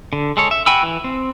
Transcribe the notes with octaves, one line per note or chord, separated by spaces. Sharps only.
D3
G#3 A4 C#5
E5
F#4 G5 G#5 B5 E6
E3
C4